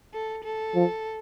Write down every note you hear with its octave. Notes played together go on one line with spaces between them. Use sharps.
A4
A4
F3